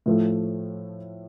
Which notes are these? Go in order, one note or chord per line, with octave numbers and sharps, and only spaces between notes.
A2 F3 A3